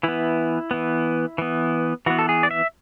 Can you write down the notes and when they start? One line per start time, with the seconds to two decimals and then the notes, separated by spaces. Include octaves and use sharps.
0.03 E3 B3 E4
0.71 E3 B3
1.38 E3 B3
2.06 E3 B3 F#4
2.19 A4
2.29 G#4
2.43 D5
2.51 E5